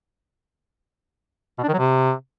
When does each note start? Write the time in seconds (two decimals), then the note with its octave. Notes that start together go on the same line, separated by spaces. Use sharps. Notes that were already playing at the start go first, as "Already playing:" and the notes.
1.58 B2
1.63 D4
1.68 D#3
1.73 F#3
1.78 C3